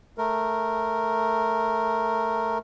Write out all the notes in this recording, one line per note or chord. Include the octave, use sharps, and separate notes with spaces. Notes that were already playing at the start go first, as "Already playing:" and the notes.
A3 A#4